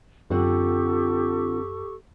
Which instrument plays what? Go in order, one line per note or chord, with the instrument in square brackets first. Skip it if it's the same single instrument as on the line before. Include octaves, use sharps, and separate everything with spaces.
[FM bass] F#2 [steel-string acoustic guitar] D3 C4 F#5 [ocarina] F4 [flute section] G4 A4 C#6